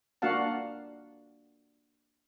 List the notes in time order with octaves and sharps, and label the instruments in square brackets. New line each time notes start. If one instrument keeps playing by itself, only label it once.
[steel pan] A#3 D4 F#4 F5 F#5 A5